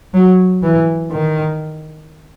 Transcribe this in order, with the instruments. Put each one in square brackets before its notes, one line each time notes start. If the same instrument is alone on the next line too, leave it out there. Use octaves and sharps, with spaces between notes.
[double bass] F#3
E3
D#3